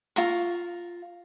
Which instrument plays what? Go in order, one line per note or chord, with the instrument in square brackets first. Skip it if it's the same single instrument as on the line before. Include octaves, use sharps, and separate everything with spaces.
[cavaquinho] F4 A#5 C#6